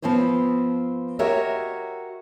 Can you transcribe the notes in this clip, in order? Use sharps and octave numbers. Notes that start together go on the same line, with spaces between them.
F3 B3 C4 C5 C#5
F#4 G4 A#4 C#5 D#5 E5